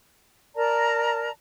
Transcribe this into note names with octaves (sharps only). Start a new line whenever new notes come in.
A#4 D5 A5 A#5